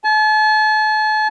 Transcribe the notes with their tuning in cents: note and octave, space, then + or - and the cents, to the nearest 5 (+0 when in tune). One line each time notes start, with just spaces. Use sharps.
A5 -40